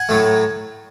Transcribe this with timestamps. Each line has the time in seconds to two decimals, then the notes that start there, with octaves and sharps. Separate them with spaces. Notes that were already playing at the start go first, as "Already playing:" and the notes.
Already playing: F#5 G#5
0.09 A2 F#3 A3